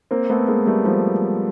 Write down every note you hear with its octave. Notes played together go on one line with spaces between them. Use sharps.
A#3 C4
A3 B3
G#3 A#3
G3 A3
F3 G3